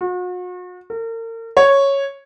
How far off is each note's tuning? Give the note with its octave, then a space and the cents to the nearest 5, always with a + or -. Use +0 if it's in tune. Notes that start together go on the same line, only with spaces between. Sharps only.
F#4 -40
A#4 -40
C#5 -5